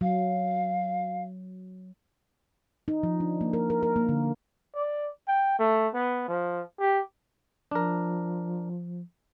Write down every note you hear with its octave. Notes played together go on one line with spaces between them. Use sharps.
F#3 F5
D#4
F3
D4
A#3
A#4
A#4
A#4
A#3
D3
D5
G5
A3
B3
F3
G4
F3 D4 A#4